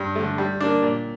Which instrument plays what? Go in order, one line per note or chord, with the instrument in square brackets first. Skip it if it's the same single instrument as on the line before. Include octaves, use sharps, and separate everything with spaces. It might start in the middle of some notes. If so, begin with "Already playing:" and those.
Already playing: [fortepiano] G2
D3 A3
G3
A#3 D4
A#2